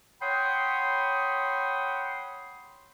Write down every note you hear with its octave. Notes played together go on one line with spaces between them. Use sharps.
C#5 F#5 G5 B5 C6 D#6